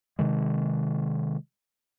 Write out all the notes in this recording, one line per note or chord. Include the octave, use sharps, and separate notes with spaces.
C3 D#3 G#3